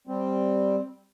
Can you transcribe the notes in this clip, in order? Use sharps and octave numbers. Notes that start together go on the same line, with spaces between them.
G3 C4